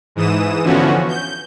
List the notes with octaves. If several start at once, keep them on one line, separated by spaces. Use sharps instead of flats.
G#2 E3 D#6 E7
D3 E3 F3 B3 C#4 F#4
G6